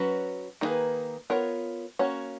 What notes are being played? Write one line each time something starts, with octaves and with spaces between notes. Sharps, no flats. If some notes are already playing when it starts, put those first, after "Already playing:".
Already playing: F#3 C#4 F#4 B4
D#3 A#3 D#4 G#4 B4
B3 F4 A#4 C#5
A#3 C#4 F#4 C#5